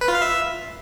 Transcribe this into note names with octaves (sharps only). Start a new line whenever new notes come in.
B4
F4
F5
E5